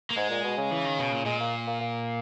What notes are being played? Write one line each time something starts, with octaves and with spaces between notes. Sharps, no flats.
A#3
G#2 G#3
A#2
B2
C#3
E3
D#3
B2
A#2
A#2 G#3
A#3
A#3
A#3